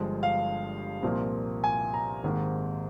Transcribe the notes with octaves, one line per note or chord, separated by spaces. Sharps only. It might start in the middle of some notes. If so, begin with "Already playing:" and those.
Already playing: G1 G2 F3 G#3
F5
C2 A#2 F3 A#3
G#5
A#5
G#1 G#2 D#3 A#3